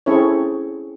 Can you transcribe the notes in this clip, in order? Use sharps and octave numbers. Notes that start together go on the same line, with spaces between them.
C4 C#4 E4 G#4 A4 C#5